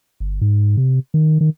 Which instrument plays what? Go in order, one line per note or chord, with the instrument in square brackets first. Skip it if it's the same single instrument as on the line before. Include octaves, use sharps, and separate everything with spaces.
[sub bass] G1
G#2
C3
D#3
D#3